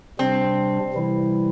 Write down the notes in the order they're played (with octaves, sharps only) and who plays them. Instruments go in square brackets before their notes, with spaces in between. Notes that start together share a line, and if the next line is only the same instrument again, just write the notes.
[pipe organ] C3 G3 D4 [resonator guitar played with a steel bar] C4
[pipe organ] C3 E3 G3 E4